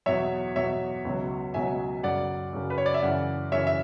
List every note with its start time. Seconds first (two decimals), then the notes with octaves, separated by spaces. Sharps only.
0.06 E2 B2 F#3 C#5 E5
0.56 E2 B2 F#3 C#5 E5
1.05 C#2 B2 F#3
1.54 C#2 B2 F#3 E5 G#5
2.03 F#2 C#3 F#3 D5 F#5
2.53 F#2 C#3 F#3
2.70 B4
2.78 C#5
2.86 D5
2.94 E5
3.02 F#2 C#3 E3 D5 F#5
3.52 F#2 C#3 E3 C#5 E5
3.67 E5